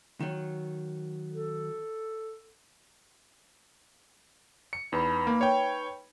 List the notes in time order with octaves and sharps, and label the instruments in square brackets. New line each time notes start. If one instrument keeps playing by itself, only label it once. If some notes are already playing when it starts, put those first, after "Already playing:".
[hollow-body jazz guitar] D#3 F#3
[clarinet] A4
[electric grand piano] C#7
[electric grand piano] E2 [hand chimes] D#4 B4 B5
[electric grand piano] A#3
C#5 G5